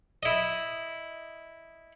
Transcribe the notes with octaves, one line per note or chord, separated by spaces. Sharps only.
E4 D#5